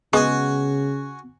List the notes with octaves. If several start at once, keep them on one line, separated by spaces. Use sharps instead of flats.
C#3 G#3 B3 F#4 G#5